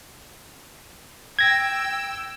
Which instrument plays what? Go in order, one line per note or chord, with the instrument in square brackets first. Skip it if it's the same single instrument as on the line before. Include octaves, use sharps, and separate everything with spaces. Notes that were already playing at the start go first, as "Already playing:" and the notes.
[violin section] G5 E6 [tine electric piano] G#6 A#6